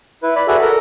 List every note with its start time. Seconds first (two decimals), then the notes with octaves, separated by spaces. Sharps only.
0.23 E4 B4
0.36 D5 B5
0.48 F#4 G#4 A4 B4 D5 E5
0.62 A4 A#4